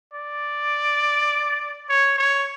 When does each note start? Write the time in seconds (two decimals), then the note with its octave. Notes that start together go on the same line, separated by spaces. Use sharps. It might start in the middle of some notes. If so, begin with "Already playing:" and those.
0.14 D5
1.89 C#5
2.18 C#5